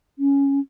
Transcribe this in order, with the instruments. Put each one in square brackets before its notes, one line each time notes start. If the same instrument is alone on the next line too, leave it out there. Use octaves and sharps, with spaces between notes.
[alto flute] C#4